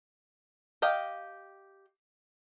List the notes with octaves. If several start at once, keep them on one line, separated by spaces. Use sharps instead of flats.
G4 D#5 F5 G5